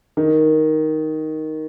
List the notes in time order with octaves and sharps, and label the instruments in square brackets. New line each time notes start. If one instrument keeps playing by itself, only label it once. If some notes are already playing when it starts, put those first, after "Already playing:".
[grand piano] D#3